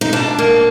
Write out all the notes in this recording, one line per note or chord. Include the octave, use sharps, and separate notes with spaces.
D#4
B2 D4
A#3